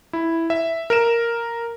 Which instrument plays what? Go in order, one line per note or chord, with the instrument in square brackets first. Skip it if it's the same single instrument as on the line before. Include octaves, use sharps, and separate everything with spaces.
[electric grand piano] E4
E5
A#4 D7 E7